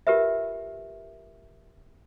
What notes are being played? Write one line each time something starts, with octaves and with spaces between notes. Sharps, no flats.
F4 G4 A#4 B4 E5